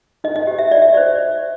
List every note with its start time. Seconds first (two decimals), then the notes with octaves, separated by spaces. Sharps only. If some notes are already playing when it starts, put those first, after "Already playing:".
0.24 D#4 D#5
0.36 D#5
0.47 G4 C5 D#5
0.59 E5
0.71 D#4 D5
0.82 E5
0.94 G4 C5 D5